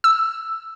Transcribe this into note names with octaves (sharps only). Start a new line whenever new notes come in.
E6